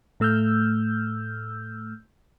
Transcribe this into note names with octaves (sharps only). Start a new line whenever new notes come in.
A2 A3 E6 F6 G6